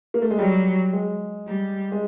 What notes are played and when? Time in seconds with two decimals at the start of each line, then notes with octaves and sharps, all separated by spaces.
0.14 A#3
0.22 A3
0.31 G#3
0.38 F#3 G3
0.93 G#3
1.47 G3
1.92 G#3